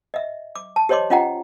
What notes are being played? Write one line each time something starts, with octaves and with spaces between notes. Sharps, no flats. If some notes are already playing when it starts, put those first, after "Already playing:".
D#5 E5
D6
A5
G4 C5 C#5 D#5 C6 D6
C#4 F4 D#5 F#5 G5 A#5